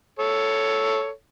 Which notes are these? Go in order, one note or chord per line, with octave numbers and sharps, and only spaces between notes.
A4 C#5